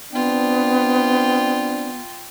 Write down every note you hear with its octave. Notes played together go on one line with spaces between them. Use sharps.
B3 C4 D4 F4 G5